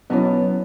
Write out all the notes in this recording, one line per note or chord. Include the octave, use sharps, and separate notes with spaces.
B2 F#3 B3 C#4 E4 C#5